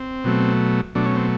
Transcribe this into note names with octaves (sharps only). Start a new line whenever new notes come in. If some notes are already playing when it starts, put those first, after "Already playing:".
Already playing: C4
B2 F#3 A3
B2 F#3 A3 D4
C#4
C4